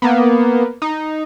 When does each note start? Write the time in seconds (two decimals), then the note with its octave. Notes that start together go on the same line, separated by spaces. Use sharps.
0.02 A#3 B3
0.82 D#4